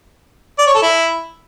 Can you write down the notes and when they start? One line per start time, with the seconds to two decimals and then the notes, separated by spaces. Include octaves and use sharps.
0.59 D5
0.67 C#5
0.75 A4
0.83 E4